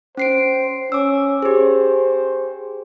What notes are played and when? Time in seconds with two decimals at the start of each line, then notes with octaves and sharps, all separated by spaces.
0.17 C#4 C5 C7 D7
0.92 C#4 D6 E6
1.42 G4 G#4 C5